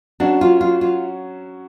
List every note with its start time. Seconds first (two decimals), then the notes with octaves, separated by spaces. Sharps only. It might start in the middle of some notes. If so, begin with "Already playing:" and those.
0.20 F#3 C#4 D4 F#4
0.41 F4
0.61 F4
0.81 F4